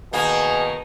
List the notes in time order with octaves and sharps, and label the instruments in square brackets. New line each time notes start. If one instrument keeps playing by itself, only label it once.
[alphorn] B2 [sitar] D#3 A#3 [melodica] G#4